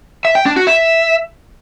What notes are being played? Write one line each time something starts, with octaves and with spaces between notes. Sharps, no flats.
E5
G5
D4
F#4
E5